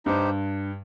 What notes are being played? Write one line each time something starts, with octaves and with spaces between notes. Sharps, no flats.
G2 D#4 G4 C5